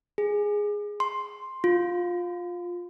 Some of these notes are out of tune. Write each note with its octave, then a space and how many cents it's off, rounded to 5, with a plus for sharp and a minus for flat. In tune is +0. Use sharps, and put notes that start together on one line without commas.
G#4 -5
C6 +5
F4 +15